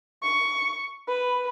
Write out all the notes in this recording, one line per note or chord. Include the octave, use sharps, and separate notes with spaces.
C#6
B4